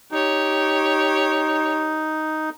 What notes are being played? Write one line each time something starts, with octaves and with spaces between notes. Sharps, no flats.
D#4 G4 C#5